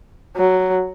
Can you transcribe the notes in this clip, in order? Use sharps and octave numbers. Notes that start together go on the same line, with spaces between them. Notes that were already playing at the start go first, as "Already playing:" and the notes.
F#3